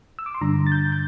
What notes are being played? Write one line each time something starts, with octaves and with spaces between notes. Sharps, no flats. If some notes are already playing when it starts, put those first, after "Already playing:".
E6
D6
C6
G2 D3 G3 D4 A#5
A6
G6
G6